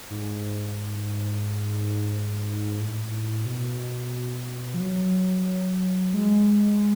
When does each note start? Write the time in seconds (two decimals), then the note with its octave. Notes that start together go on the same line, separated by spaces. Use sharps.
0.11 G#2
2.79 A2
3.46 B2
4.74 F3
4.80 F#3
6.14 G#3